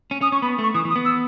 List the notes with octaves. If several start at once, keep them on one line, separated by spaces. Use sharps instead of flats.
C#4
C#4 D#6
C#4 C#6
B3 B5
A3 C#6
E3 D#6
E3
D#6
B3
E6